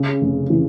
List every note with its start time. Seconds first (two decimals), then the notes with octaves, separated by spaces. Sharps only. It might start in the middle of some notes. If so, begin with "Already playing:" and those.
Already playing: C#3
0.21 F1
0.50 E3